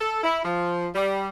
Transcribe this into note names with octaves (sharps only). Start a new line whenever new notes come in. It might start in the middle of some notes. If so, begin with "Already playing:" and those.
A4
E4
F3
G3